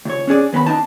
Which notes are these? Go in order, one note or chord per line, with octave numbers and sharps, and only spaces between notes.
C#2 C#5
C#4 D4 G#4 D5
D#2 B3 G4 B5
D4 D#4 A5